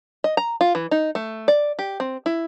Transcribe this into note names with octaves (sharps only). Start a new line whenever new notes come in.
D#5
A#5
F4
E3
D#4
A3
D5
G4
C4
E4